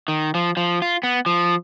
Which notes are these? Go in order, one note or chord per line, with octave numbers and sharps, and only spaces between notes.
D#3
F3
F3
F4
B3
F3